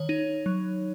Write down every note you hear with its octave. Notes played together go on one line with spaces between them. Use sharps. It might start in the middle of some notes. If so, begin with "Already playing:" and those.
Already playing: D#3 C#5
D#4
F#3